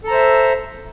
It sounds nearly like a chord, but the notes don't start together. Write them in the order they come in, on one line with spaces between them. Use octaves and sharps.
A4 A#5 C5 E5